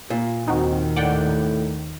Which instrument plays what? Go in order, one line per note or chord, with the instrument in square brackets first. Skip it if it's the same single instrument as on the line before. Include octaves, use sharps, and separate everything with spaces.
[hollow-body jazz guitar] A#2 [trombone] F4
[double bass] D#2 D#3 [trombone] C4 [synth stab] D#4 F#4
[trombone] A2 [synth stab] D5 F#5 G5